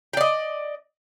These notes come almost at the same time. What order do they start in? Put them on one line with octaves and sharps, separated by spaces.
G5 D5 D#5